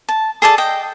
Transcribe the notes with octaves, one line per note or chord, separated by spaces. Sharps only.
A5
G#4 A4 D5 A5
D#5 G5